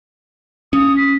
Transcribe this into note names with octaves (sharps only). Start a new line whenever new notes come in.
C#4 D#6
B6